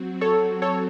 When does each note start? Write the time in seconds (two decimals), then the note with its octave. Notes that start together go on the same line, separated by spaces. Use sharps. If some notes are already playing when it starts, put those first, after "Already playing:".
Already playing: F#3 C4 F#4
0.21 A4 C#5
0.62 A4 C#5